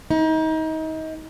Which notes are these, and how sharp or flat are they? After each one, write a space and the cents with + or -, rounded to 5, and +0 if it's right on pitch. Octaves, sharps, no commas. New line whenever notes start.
D#4 +30